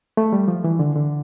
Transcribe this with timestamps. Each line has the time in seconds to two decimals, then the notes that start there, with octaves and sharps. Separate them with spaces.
0.17 A3
0.33 G3
0.48 F3
0.64 E3
0.79 D3
0.95 D3